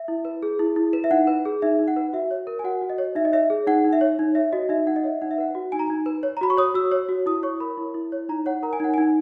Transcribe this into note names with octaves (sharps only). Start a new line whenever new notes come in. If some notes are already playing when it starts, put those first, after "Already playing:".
Already playing: E5
E4
B4
G#4
E4
E4
B4
E5
D#4 F#5
B4
G#4
D#4 E5
D#4
F#5
B4
F#4 E5
C#5
A#4
G#5
F#4 F#5
F#4
D#5
C#5
D#4 E5
D#5
C#5 E5
G#4
D#4 F#5
D#4
E5
C#5
D#4
C#5 E5
F#4 D#5
D#4 E5
D#4 F#5
D#5
C#5 E5
D#4 F#5
E5
B4 F#5
F#4
D#4 G#5
A#5
D#4 G#5
B4
C#5
A#5
F#4 B5
C#6
C#5 D#6
F#4 E6
C#5
F#4
E4 D#6
C#5 C#6
A#4 B5
E4
E4
C#5
D#4 A#5
C#5 F#5
A#4 A#5
G#5
D#4 F#5
D#4 G#5